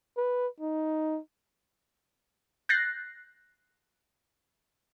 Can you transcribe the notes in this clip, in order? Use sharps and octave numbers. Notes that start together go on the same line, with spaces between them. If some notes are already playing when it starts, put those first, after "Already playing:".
B4
D#4
F#6 G6 A6 A#6 C7